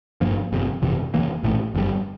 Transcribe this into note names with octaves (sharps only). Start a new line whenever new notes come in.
G1 G2 F3 A#3
G1 F2 C3
G1 F2 C3 E3
F1 E2 E3 A#3
A#1 A2 E3
G1 F2 C3 G3